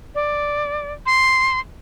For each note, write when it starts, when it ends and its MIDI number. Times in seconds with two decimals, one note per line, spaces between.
0.15 0.93 74
1.06 1.59 84